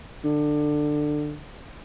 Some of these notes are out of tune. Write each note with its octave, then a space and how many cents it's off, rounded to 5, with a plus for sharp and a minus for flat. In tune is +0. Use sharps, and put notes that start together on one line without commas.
D3 +20